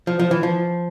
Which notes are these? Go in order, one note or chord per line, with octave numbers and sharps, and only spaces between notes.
F3
F3
E3
F3